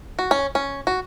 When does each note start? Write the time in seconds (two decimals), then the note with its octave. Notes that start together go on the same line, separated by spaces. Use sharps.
0.19 F#4
0.31 C#4
0.55 C#4
0.87 F#4